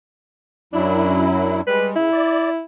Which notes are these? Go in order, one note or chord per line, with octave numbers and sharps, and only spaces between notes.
F#2 F#3 D4 E4
D4
G3 G#3 B4
C#3 E4
D5